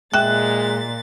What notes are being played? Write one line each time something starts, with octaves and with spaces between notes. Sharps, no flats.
A#2 G#3 E5 G5 F#6 A6